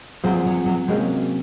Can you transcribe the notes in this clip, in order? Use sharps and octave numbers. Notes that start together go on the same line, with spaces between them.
A#2 F3 F#3 C4 F4 G#4
F#3
F#3
C3 F#3 G#3 A#3 C#4